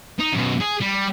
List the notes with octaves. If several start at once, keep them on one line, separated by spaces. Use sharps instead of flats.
D#4
F#2 B2
G#4
G3